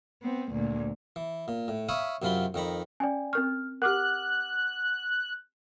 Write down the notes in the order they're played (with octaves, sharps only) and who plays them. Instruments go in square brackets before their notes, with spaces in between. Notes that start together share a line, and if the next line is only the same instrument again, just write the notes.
[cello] B3 C4
D2 A#2
[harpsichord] E3
A#2
A2
C#5 E5 F5 B5 D#6
F#2 C3 F#3 F4 B5 C6
F2 D#3 A#5 B5
[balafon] C#4 [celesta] D5 G5 G#5
[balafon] C4 A#4 C#6 [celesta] F6
[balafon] G4 A#4 [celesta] F#5 D6 F6 [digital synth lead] F#6